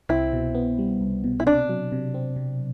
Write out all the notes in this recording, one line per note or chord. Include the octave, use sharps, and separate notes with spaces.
C2 C4 E4
B2
B3
G3
C2
B2
E4
C3 D4
F#3
C3
C4
C3